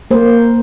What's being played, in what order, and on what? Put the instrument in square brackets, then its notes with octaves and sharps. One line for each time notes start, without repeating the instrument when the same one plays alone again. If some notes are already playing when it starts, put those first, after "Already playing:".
[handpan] A#3 C5